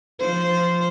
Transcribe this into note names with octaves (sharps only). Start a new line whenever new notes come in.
F3 C5